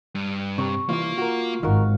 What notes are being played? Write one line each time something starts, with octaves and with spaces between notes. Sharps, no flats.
G2
C3 A#5 C#6
C2 E3 A#3 F4 F5
F#4 A#4
G#1 D#3 F#4 A#4 F5